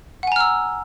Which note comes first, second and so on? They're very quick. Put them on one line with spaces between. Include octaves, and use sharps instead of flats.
F#5 G#5 A#5 F6 E6